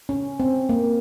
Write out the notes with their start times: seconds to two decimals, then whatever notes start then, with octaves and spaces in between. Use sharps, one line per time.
0.09 C#4
0.40 C4
0.69 A#3